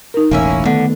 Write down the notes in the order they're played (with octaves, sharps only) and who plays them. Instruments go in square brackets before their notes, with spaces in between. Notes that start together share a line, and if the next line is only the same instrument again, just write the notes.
[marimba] D#4 A#4
[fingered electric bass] E1 A1 [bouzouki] A#3 C#4 E4
[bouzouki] D3 [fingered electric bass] D#3 A3 B3